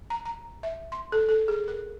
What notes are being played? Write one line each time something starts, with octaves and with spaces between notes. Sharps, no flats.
A#5
A#5
E5
C6
A4
A4
G#4
A#4